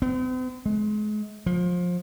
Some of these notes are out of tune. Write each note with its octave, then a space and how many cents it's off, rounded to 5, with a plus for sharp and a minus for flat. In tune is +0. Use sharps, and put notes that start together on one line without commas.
C4 -45
G#3 +30
F3 +25